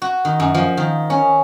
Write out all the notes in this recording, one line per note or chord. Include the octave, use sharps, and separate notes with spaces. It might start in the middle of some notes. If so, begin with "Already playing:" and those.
F#4
D#3
F#2
F3
D#3
C#4